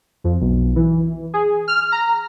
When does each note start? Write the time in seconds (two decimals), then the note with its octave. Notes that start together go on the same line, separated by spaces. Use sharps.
0.24 F2
0.41 B1
0.76 E3
1.34 G#4
1.68 F6
1.92 A#5